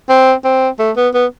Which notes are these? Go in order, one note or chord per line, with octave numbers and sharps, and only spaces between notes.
C4
C4
A3
B3
B3